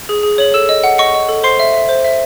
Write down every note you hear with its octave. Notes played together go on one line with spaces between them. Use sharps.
G#4
G#4
C#5 F#7
A4 E6 E7
D#5
F#5
D#5 C#6 C#7
D#5
A4
C5 C6 C7
E5
E5
C5
E5